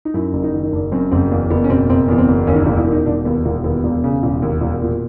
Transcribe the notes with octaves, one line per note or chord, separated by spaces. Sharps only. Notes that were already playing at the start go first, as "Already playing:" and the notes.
D#4
F#2 E4
F#1
D#4
D#3
D#4
F#1 D4
F#2 C4
F#1 C4
E2 A#3
F#1 B3
C#4
B2 C4
F#1 C4
E2 B3
C4
F#1
D#2 C#4
D#4
D4
E1
E4
D#3 D#4
E1 D4
D#2 B3
E1 A#3
D#2 B3
E1
C#3
E1
D#2
E1
A#2